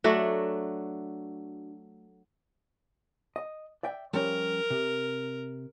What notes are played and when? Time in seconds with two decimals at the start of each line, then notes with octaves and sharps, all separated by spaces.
0.04 F#3 A3 D4 F#4
3.36 D#5
3.83 D5 E5 G5
4.13 F3 G3 C#4 A#4
4.70 C3